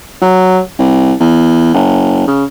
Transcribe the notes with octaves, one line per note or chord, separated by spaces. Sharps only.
F#3
C2
E2
F#1
C#3